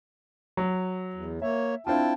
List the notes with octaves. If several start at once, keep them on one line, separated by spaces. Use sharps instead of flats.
F#3
E2
A#3 C#5 E5
C4 D4 E4 F4 G5 A5